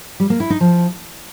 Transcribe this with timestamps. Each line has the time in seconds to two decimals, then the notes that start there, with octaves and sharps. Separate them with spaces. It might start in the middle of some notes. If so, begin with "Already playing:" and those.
0.20 G3
0.30 A#3
0.40 E4
0.50 D#4
0.60 F3